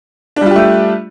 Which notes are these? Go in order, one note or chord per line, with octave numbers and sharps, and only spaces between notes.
G3 A3 D4 F4 G4